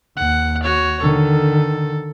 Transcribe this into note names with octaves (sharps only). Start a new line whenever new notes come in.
D#2 F#5
F#4 C#5
D3 D#3 A4